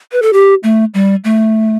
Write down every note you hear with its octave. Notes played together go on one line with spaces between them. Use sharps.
B4
A4
G4
A3
G3
A3